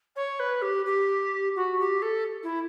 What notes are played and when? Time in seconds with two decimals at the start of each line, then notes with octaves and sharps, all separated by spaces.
0.16 C#5
0.39 B4
0.62 G4
0.85 G4
1.56 F#4
1.79 G4
2.02 A4
2.43 E4